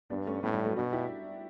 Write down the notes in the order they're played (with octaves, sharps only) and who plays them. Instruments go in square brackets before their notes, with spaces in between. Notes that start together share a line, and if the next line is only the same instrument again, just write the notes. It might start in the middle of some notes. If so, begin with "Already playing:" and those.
[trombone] G2 [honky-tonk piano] B3 D4
[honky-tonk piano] A3 C#4
[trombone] A2 [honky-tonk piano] G3 B3
[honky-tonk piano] G3
F#3 A3
[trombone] B2 [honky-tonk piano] D4 F#4
[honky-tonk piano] E4 G4